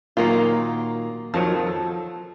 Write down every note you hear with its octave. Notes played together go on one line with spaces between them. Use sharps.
A#2 D#3 F#3 A#3 F4
F2 D#3 F3 F#3
A4